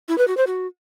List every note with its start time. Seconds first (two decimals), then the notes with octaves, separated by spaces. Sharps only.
0.08 E4
0.18 B4
0.28 F#4
0.37 C5
0.47 F#4